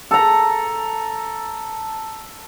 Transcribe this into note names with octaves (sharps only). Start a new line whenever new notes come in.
A4 A#5